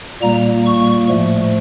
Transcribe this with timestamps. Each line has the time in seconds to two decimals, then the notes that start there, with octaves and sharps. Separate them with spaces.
0.22 A#2 G3 A#3 A#5
0.66 C#6
1.09 A2 F3 A3